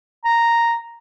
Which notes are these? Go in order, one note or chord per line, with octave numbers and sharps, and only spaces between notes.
A#5